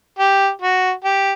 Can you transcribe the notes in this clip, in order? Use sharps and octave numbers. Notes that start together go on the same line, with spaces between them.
G4
F#4
G4